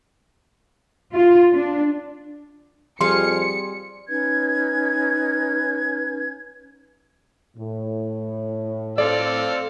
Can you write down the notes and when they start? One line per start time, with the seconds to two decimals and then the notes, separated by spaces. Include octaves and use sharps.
1.13 F4
1.54 D4
3.01 F2 G3 G#4 F5 C6 C#7
4.08 C#4 D#4 B4 G#6
7.57 A2
8.98 C4 A4 D5 F5